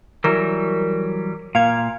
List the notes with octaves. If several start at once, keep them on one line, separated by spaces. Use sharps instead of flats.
E3 F#3 G3 A#4
A#2 F5 G#6